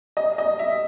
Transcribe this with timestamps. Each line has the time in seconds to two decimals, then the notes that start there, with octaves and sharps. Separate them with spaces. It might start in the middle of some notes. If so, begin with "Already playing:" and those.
0.17 D#5
0.38 D#5
0.59 E5